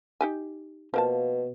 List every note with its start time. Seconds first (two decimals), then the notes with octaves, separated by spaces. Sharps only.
0.21 D#4 G4 G#5
0.94 B2 F3 A#3 A5